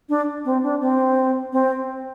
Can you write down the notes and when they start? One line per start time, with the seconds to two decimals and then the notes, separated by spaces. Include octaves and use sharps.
0.09 D4
0.45 C4
0.63 D4
0.81 C4
1.53 C4